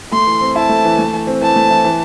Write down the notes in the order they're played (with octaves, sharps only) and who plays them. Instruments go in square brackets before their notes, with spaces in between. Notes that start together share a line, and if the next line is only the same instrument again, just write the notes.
[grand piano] A3 [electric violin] C6
[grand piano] E3
C4
[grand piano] E4 [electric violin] A5
[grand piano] A3
E3
A3
E3
C4
[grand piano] E3 [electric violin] A5
[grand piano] A3
E3
E3